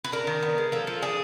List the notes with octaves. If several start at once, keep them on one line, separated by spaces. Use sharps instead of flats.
B4
D4 A#4
D#3
B3
G#3
F3 A4
F3
D4 G#4